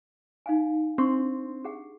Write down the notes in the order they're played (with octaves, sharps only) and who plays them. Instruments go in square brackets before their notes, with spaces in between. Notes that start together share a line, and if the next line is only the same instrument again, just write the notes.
[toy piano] D#4 F5 G#5
[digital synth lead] C4 [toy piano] D4 C6 C#6
[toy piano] G4 G#4 F#5